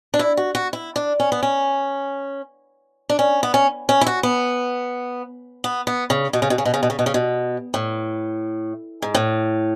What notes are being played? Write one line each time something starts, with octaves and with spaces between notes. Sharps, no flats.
D4
E4
F#4
F#4
E4
D4
C#4
B3
C#4
D4
C#4
B3
C#4
C#4
E4
F#4
B3
B3
B3
C#3
B2
C#3
B2
C#3
B2
C#3
B2
C#3
B2
C#3
B2
A2
G#2
A2